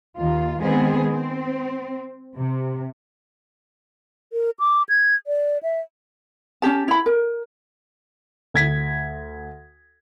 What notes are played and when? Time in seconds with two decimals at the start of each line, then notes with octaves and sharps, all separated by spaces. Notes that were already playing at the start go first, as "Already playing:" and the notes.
0.15 D#2 D#3 F4
0.61 D#3 G#3 B3 C4 G#4
1.09 C4
2.37 C3
4.33 A#4
4.59 D6
4.89 G#6
5.27 D5
5.63 E5
6.62 C#4 D#4 G4 A5
6.88 E4 B5
7.06 A#4
8.54 D2 G#6 B6